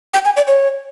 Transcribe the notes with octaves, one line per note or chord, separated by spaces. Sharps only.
G5
G#5
D5
C#5